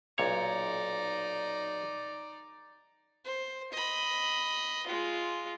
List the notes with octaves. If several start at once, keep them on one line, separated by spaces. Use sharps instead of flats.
B1 A#2 D#4 C#5 D5
C5
D#5 B5
G#3 F4